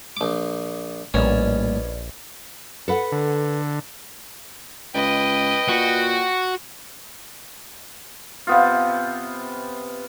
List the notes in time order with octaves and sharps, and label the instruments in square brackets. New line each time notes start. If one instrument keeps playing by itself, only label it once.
[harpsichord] A#1 D6
[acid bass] A#1 [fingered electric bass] A2 G3 A#3 [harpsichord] C#4 [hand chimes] B4 D5 D#5
[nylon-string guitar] A4 B4 F#5
[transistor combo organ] D3
[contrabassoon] C#2 [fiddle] B4 D#5 [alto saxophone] G5
[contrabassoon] A#2 [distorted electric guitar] F#4
[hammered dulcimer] C3 B3 F4